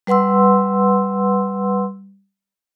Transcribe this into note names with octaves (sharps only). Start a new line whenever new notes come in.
G3 B4 F#5 C6 E6